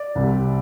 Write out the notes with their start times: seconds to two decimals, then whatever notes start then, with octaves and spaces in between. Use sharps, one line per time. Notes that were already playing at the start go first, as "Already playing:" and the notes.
Already playing: D5
0.15 C2 C3